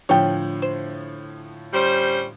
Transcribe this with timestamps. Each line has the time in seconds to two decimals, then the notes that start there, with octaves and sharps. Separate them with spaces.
0.09 A2 D3 F3 C#5 G5
0.62 C5
1.73 G3 C#4 C5